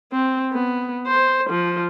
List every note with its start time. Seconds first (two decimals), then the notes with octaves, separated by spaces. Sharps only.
0.13 C4
0.53 B3
1.08 C5
1.50 F3